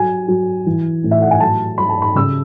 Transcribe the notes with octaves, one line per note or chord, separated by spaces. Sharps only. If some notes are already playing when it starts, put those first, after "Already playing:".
Already playing: F#3 G#5
F#3
E3
A2
E5
F#5
G#5
F#3 A5
F#3 B5
A5
B5
C#3 E6